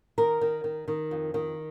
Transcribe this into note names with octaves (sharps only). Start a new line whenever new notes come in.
D#3 A#4
D#3
D#3
D#3
F2
D#3